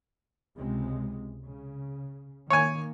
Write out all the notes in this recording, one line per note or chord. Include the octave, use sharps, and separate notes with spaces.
C#2 C3 G#3
C#3
D#3 A#3 C#5 G#5